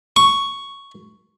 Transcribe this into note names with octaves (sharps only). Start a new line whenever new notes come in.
C#6